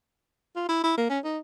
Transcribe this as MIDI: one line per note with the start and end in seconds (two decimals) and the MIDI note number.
0.56 0.66 65
0.69 0.80 64
0.84 0.94 64
0.97 1.09 58
1.10 1.19 61
1.24 1.39 63